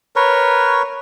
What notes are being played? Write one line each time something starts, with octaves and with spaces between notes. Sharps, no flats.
A#4 B4 C#5